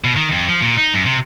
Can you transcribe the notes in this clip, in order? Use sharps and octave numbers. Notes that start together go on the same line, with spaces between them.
B2
D#3
F2
F3
A#2
D#4
F#2
C3